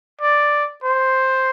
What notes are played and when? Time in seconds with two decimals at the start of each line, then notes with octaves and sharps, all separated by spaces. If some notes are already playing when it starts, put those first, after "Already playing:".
0.21 D5
0.84 C5